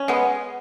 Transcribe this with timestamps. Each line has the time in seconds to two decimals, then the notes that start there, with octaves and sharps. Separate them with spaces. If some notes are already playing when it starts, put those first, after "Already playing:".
Already playing: C#4
0.08 G#3 B3